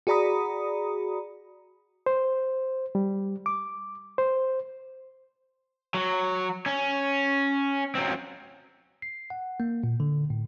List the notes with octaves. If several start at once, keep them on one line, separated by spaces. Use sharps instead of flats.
F#4 G#4 D5 A#5 B5 D#6
C5
G3
D6
C5
F#3
C#4
F#3 C4
C7
F#5
A#3
A#2
D3
A2